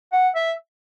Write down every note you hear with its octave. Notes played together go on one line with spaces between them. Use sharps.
F#5
E5